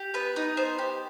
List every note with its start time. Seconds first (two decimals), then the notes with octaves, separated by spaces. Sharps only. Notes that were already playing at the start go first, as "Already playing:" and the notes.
Already playing: G4
0.14 B3 B4
0.36 D#4
0.57 B3 C5
0.78 G4